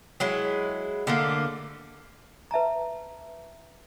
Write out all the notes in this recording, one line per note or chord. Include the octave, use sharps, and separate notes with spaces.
F#3 G#3 E4
D3 A3 A#3
B4 E5 A5 A#5